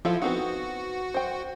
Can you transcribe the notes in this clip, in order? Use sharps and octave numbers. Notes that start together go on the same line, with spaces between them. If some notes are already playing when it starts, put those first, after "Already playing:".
F3 E4 A4 F5
B3 C4 D#4 F#4
C5 G5